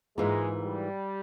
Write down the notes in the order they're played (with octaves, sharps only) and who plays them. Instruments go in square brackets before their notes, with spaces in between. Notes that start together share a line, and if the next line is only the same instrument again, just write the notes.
[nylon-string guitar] G#2 E3 A#3 F4 [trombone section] G#3
[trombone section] G3